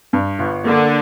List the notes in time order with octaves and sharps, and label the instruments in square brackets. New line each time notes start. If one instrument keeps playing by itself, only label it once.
[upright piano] G2
G1
[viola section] D3 [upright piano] A#3